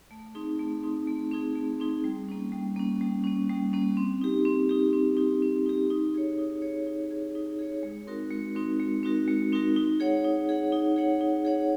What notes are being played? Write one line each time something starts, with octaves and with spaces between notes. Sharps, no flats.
A3
C4 D#4 G#4
A3
C4 D#4 G#4
A3
C4 D#4 G#4
A3
C4 D#4 G#4
G3
A#3 C#4
G3
A#3 C#4
G3
A#3 C#4
G3
A#3 C#4
C4
D#4 G4
C4
D#4 G4
C4
D#4 G4
C4
D#4 G4
D#4
G#4 C#5
D#4
G#4 C#5
D#4
G#4 C#5
D#4
G#4 C#5
G#3
C4 D#4 F#4 A#4
G#3
C4 D#4 F#4 A#4
G#3
C4 D#4 F#4 A#4
G#3
C4 D#4 F#4 A#4
D#4
G#4 C#5 F#5
D#4
G#4 C#5 F#5
D#4
G#4 C#5 F#5
D#4
G#4 C#5 F#5